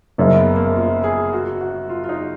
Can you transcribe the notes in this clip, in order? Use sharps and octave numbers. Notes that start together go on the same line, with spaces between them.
F#1 F#2 C#3 A#3
B3
A#3
F4
G#4
F#4
F#4
F4
F4
D#4